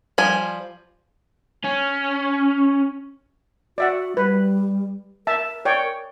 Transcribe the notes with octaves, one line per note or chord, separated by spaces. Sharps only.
F3 G3 G#5
C#4
F#4 D5 E5 F#5
G3 B4
A#4 E5 A5
C#5 D5 G5